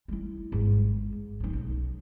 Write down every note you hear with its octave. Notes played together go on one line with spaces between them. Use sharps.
G3 E4
G#1 G#2
F#3 D#4
B1